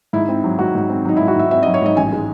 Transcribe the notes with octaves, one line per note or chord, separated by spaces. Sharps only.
G#2 E4
C4
F#3
G#2 F#4
G#2
C4
F#3 D#4
E4
G#2
F#4
G#2 E5
C4 E5
D#5
F#3
C#5
G#2 D#5
A1 G#5
G#3